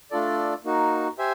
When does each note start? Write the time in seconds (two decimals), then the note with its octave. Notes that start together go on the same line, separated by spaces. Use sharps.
0.11 A3 D4 F4 A4 D5
0.64 A#3 D#4 F#4
1.18 G4 C5 E5 G#5